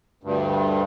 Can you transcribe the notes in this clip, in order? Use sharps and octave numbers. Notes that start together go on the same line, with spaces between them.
D2 G2